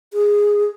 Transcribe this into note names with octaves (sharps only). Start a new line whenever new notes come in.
G#4